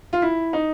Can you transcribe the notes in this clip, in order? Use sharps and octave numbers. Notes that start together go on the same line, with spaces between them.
F4
E4
D#4